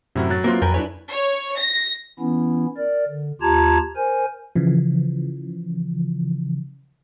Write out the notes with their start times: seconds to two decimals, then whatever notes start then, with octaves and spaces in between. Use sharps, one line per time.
0.16 F#2 A2 C3 E4 F#4 A#4
0.30 F#3 F#6 A6
0.44 E3 A#3 C4 F4
0.62 F2 A#4 B4 G5 G#5
0.74 D4 E4 B4 C#5
1.12 C#5
1.59 A#6
2.20 E3 B3 C#4 E4
2.77 A#4 D5
3.08 D3
3.41 D#2 F4 G4 A5 A#5 G#6
3.96 A#4 C5 G#5
4.55 C#3 E3 F3